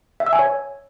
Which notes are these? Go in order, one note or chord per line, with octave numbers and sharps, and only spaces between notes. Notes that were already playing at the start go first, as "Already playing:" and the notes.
E5
E6
G#5
C#5